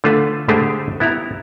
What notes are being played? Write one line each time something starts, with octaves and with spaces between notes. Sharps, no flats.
D3 A3 F4 A4 B4
D3 G#3 A3 G4 G#4 C5
B3 E4 G4 A#5